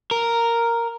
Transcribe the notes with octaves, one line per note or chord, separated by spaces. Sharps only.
A#4